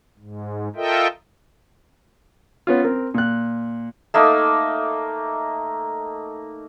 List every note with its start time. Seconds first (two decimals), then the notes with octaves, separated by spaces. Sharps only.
0.19 G#2
0.76 F4 A4 A#4 D#5 E5 G5
2.67 B3 C#4 F4
2.84 C4 A#4
3.14 A#2 F#6
4.14 A3 A#3 D#4